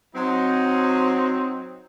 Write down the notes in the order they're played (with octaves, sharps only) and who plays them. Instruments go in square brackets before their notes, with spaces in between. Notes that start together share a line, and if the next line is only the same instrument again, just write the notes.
[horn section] F#3 C4 D#4